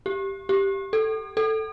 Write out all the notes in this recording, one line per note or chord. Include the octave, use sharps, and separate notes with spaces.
G4
G4
A4
A4